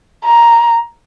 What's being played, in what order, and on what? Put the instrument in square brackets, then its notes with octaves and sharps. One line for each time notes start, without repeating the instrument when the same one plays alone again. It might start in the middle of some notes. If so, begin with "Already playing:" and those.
[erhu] A#5